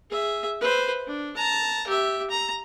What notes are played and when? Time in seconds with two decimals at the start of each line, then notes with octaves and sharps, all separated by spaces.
0.10 G#4 E5
0.61 B4 C5
1.07 D4
1.37 A5 A#5
1.87 G4 E5
2.30 A#5